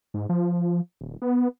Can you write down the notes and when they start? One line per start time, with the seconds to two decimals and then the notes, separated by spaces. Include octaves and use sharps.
0.14 G#2
0.29 F3
1.01 D#1
1.22 B3